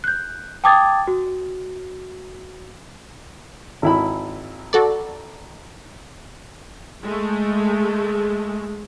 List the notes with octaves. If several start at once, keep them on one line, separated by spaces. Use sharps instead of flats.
F#6 G6
G5 A5 D6 D#6 G#6 A6
F#4
G#1 E4 B5
F#4 A4 D5
G#3 A3